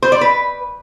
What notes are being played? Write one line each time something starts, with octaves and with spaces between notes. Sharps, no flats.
C5
D5
B4